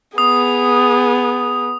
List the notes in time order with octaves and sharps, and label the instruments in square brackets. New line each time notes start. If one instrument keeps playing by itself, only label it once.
[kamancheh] B3 G#4 [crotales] D#6